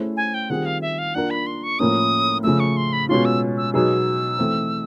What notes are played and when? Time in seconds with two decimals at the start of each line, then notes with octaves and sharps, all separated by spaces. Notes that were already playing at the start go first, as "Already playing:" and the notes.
Already playing: A3 C#4 E4 G#4 C5
0.17 G#5
0.34 G5
0.50 D#3 G3 C4 F4 G#4 F#5
0.66 F5
0.82 E5
0.99 F5
1.15 A#3 D4 F4 A#4 F#5
1.30 B5
1.47 C6
1.63 C#6
1.79 A2 F3 A#3 C#4 D#6
2.43 C#3 F3 A3 E6
2.60 C#6
2.77 C6
2.93 B5
3.09 B2 G#3 C#4 F4 C6
3.25 E6
3.57 E6
3.74 B2 F#3 B3 D#4 G#4 E6
4.38 E3 A3 C4